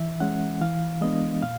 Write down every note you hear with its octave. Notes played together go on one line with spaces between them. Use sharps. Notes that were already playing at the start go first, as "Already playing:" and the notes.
Already playing: E3 E5
G#3 C#4 F#5
E3 F5
G#3 B3 D4 D#5
A#2 F5